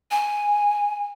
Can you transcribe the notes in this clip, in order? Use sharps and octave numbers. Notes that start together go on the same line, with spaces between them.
G#5